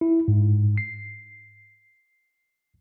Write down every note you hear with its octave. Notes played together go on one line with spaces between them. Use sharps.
E4
G#2
C7